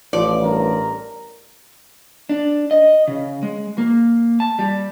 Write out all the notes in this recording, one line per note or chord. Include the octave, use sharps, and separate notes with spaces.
A1 F3 D5
G2 A#4
D4
D#5
C#3
G#3
A#3
A5
G3